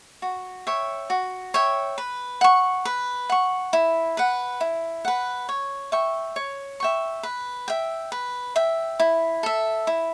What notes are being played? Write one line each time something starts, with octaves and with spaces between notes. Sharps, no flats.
F#4
C#5 E5 G5
F#4
C#5 E5 G5
B4
F#5 C#6
B4
F#5 C#6
E4
B4 F#5
E4
B4 F#5
C#5
E5 G5 C#6
C#5
E5 G5 C#6
B4
E5 G5
B4
E5 G5
E4
A4 E5
E4